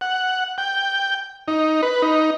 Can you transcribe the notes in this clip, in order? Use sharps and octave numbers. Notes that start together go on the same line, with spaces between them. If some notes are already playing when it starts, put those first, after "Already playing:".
F#5
G5
D#4
B4
D#4